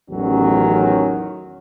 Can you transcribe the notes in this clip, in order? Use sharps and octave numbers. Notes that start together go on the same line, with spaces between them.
A1 E2 D#3 F#3 C#4